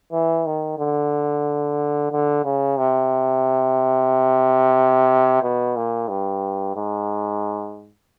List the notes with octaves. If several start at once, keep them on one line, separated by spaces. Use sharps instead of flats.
E3
D#3
D3
D3
C#3
C3
B2
A#2
G2
G#2